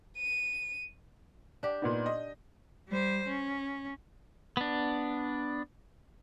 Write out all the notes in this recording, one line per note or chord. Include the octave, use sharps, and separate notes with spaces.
D#7
D4 G4
A#2 B3 D#4
D#5
G3 C5
C#4
B3 D4